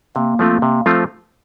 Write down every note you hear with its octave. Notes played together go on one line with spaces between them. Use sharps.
C3 A#3
F3 A3 C4 F4
C3
F3 A3 C4 F4